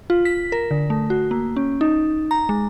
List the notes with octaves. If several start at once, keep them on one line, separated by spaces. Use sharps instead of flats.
F4
B6
A#4
D3
A3
F#4
A#3
C#4
D#4
A#5
G#3